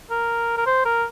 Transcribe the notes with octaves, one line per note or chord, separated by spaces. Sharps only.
A#4
A#4
C5
A#4